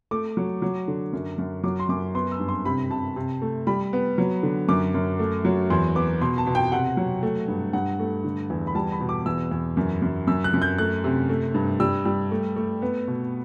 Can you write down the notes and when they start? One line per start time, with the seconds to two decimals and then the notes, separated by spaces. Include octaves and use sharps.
0.11 A3 D6
0.37 F#3
0.62 F#3
0.88 D3
1.13 F#2
1.38 F#2
1.64 F#3 D6
1.80 C6
1.89 F#2 D6
2.14 B3 C6
2.32 E6
2.40 G2
2.49 C6
2.65 C3 B5
2.90 C3 A5
3.16 C3
3.42 A3
3.67 G3 B5
3.93 B3
4.18 F#3
4.43 D3
4.68 F#2 D6
4.94 F#2
5.19 A3
5.45 F#3
5.70 E2 C6
5.95 B3 D6
6.21 B2 C6
6.38 A5
6.47 B2
6.55 G5
6.72 C3 F#5
6.97 F#3
7.23 A3
7.48 G2
7.73 G2 F#5
7.99 A3
8.24 D3
8.50 E2
8.67 B5
8.75 G3 A5
8.92 B5
9.01 B2
9.09 D6
9.26 E2 E6
9.51 E2
9.77 F#2
10.02 F#2
10.27 F#2 E6
10.44 F#6
10.54 F#2
10.62 G6
10.78 A3 F#6
11.04 C3
11.29 A3
11.54 G2
11.80 G3 E6
12.05 G3
12.31 A3
12.56 A3
12.82 B3
13.08 B2